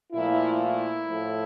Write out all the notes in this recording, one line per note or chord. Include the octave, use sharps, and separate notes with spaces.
A#2 F3 A3 E4
E4
A2 F3 A3